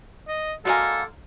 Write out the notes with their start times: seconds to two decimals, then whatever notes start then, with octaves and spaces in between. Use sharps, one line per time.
0.28 D#5
0.65 D3 G#3 A#3 F#4 A4 G#5